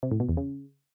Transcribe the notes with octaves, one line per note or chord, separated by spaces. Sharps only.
C3
A2
B2
E2
C#3